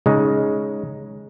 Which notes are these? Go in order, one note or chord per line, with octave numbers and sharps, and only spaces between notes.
C#3 G#3 D#4